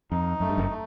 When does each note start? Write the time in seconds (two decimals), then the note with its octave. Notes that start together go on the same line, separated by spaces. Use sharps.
0.11 F2 D#4
0.40 F#2 A3
0.49 G2
0.58 F#1 F#2
0.70 A3